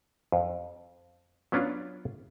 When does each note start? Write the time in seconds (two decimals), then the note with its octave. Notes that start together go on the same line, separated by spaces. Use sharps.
0.32 F2
1.52 F#3 B3 C#4 D4 F4